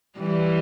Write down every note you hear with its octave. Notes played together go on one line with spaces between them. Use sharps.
E3 G3